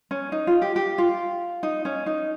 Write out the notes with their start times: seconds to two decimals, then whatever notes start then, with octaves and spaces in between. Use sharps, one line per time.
0.11 C#4
0.32 D#4
0.47 F4
0.62 G4
0.76 G4
0.98 F4
1.63 D#4
1.85 C#4
2.06 D#4